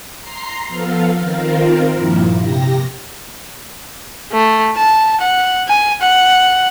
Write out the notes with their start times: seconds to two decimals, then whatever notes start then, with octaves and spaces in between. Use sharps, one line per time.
0.19 A#5 C6 C7
0.68 F3 B3 A4 F5
1.15 D#3 C4 F4 A#4
1.93 G2 A#2 F3 A#3 E4
2.37 C3 G4 A#6
4.33 A3
4.76 A5
5.21 F#5
5.69 G#5
6.02 F#5